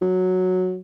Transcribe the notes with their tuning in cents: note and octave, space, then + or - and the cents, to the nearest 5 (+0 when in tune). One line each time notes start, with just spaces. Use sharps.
F#3 -5